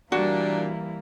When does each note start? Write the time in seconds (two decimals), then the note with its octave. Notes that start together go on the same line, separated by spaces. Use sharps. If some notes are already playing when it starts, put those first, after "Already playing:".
0.12 A#2 E3 G3 A#3 D4 F#4